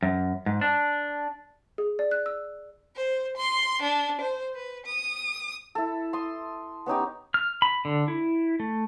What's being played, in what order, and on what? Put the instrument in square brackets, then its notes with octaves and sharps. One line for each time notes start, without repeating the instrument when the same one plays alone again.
[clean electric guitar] F#2
G#2
D4
[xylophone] G#4
D5
F#6
E6
[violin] C5
C6
D4
C5
B4
D#6
[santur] E4 A4
C6 D#6
B3 C#4 D#4 G4
[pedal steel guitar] F6
B5
D3
E4
A3